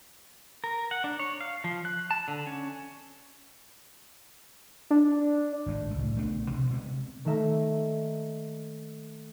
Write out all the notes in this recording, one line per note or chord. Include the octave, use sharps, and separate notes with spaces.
A#4
F#5
D4
C#5
F5
F3
F#6
A5
D3
C#4
D4
G#1 A2 G#3
C#2 A2
A#1 A3 B3 D4
D2 B2
C3 G#3 A#3 B3
D#3 A3 A#3 E5 A#5